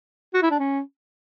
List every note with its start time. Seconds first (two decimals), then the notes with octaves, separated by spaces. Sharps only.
0.34 F#4
0.42 E4
0.51 D4
0.59 C#4